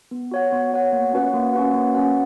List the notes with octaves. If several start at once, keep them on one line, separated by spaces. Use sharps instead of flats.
B3
F#4 C#5 F#5
B3
F#4 C#5 F#5
A#3
C#4 F#4 B4 F#5
A#3
C#4 F#4 B4 F#5
A#3
C#4 F#4 B4 F#5